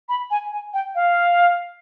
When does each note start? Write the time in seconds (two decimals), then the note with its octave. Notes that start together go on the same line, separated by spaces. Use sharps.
0.09 B5
0.31 G#5
0.52 G#5
0.74 G5
0.95 F5